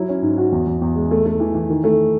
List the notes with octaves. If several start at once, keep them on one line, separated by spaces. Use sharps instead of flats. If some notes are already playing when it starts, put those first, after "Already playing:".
Already playing: F#3 E4
C#4
G#2
F#4
E2
E2
E2
G#3
A3
A3
E3
E3
D#3
A3